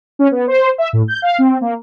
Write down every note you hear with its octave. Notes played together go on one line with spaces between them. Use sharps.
C#4
B3
C5
E5
A2
G6
F5
C4
A#3